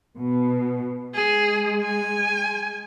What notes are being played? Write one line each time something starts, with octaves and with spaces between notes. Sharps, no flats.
B2
G#3 G#4
G#5